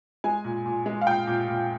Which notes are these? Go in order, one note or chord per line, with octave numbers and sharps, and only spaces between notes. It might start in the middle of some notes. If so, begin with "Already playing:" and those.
G#3 G#5
A#2
A#2
G#3
F5
A#2 G5
A#2
A#2